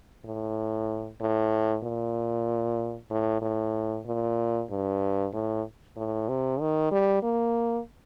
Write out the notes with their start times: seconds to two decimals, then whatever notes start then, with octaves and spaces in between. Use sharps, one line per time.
0.25 A2
1.21 A2
1.83 A#2
3.10 A2
3.42 A2
4.06 A#2
4.70 G2
5.33 A2
5.97 A2
6.28 C3
6.60 D#3
6.92 G3
7.23 A#3